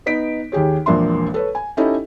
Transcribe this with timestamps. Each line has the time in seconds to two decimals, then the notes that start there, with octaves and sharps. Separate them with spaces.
0.06 B3 D#4 B6 D7
0.52 D#2 D#3 G4 G#4 C#5
0.86 E1 A#1 A#3 D4 E5 C6
1.34 A4 B4 C#5
1.55 G#5
1.77 C#4 D#4 E4 G4 A4 D#5